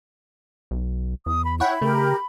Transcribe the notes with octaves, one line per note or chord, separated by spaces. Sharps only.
B1
E2 D#6
B5
E4 C#5 F#5 G5 B5
C#3 A3 G4 A#4